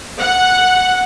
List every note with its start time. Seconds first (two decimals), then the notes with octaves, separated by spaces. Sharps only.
0.18 F#5